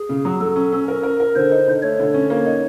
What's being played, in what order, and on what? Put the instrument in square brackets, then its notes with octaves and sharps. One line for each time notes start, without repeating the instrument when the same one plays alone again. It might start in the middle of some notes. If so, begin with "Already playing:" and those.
Already playing: [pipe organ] G#4
[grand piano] C#3
F#3
[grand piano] F#3 [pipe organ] A4
[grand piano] C#4
C#4
A#4
A#4
A#4
[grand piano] D3 [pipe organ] C5
[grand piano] D#4
D3
[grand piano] A3 [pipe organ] C#5
[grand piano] D3
C#4
A#3
D#4